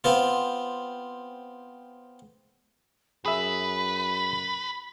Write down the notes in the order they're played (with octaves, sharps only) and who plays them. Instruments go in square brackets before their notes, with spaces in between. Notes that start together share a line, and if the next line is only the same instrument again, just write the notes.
[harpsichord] B3 C4 F4
[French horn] F#2 [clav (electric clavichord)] G#4 E5 [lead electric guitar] B4 [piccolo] B5